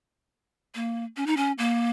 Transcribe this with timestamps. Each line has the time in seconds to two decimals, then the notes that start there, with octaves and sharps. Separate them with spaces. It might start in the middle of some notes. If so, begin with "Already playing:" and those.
0.75 A#3
1.17 C#4
1.26 D#4
1.37 C#4
1.58 A#3